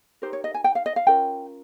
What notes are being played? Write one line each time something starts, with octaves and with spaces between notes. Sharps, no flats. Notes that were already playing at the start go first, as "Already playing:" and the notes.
D#4 G4 A#4 C5
C#5
D#5
G#5
G5
F5
D#5
F5
C#4 F4 A#4 G5